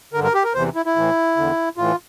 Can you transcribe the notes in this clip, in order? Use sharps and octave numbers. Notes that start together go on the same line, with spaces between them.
G2 D3 A#4
A#4
G4
A#4
E2 C3 E3 C5
E4
E4
A2 E3
E2 D3
A2 E3 F4